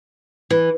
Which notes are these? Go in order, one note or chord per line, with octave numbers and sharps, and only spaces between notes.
E3